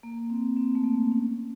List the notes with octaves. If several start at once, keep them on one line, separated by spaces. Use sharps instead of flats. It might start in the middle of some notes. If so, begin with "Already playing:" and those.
A#3
C4
C4
A3
A#3
C#4